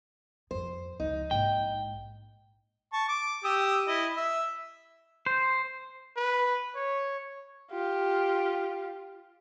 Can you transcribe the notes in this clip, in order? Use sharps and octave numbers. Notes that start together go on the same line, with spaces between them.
F2 F3 C5
C#2 F3 D#4
A#1 G#2 G5
A5 C#6
D6
G4 D#6 E6
E4 D#5
E5
C5
B4
C#5
F4 G4